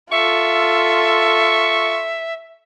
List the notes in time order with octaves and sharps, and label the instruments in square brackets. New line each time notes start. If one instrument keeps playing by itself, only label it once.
[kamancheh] F4 A4 [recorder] E5 [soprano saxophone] C#6